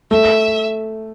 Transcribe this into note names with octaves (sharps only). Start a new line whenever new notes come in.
A3 E5